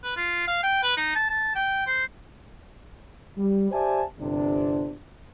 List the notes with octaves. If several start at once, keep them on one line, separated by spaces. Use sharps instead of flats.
B4
F4
F5
G5
B4
D#4
A5
A5
G5
C5
G3
G4 C5 D5 E5 G#5 A5
G1 C3 D4